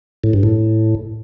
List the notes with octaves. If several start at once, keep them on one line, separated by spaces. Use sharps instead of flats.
A2
G2
A2